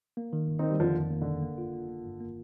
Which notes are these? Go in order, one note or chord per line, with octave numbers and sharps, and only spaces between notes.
A#3
D#3
G1
D#3 C4 D#4
G3
F2 D3 F3
F2
A#3
D3
G1
A#3
F4
A#3
A#3
G2
A#3